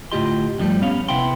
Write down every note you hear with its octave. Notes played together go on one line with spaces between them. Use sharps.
D2 A2 F4 G4 D#5 C6
G2 D3 F3 G3 A3
B3 C#4 C#5 F5
C3 B3 E4 G5 C6